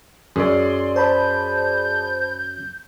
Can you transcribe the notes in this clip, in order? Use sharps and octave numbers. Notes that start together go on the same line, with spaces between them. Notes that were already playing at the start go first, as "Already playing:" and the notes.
F#2 G#4 D5 C6
C5 A5 B5 G6